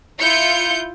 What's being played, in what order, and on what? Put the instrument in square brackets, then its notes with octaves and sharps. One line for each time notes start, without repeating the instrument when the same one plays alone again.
[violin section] E4 F4 G6 C#7